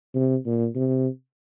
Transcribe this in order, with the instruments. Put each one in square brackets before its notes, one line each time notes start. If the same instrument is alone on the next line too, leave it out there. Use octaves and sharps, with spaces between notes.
[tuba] C3
A#2
C3